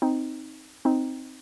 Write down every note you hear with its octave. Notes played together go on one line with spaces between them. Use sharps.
C4 D#4
C4 D#4